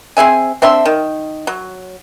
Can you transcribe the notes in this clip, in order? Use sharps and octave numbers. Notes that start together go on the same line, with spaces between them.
C4 G#4 E5 G#5
C4 D4 E5 C6
D#3
F#3